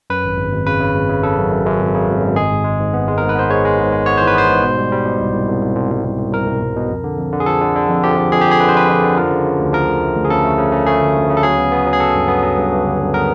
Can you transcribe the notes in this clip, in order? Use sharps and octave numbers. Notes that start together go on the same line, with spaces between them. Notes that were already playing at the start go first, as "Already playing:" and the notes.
F#2 B4
G#1
G#1
G#1
C#3 B4
C#3
G#1
C#3
C#3 A4
F#2
F#2
F#2
G#1
C#3
G#1
G#1
G#3 G#4
G#2
G#3
G#2
B3
G#3
G#2 A#4
B4
B3 C5
G#3 C#5
G#3
G#2
G#3
B3 C#5
E3 C5
B4
B3 C5
G#2
B2
G3
G3
B2
C2
C2
C2
C2
C2
C2
C2
C2
C2 A#4
C2
C2
B2
F2
D3
F2
D3
G#4
F3 A4
D3
D3
F2
F3 G4
D3
F2 G#4
G4
F2 G#4
D3 B4
C5
F2 B4
F2
D3
F3 A#4
C#3
C#3
D2
F3 A#4
D2
A3
D2
G#4
C#3 A4
A3
C#3
C#3
A3 G#4
D2
D2
C#3
A4
F#3 G#4
B3
B3
F#3
G#4
F#3 A4
G2
B3
F#3
G2
G2
D3
G2
B3 A#4